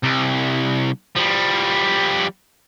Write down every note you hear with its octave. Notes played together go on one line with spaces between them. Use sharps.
C2
F3 G3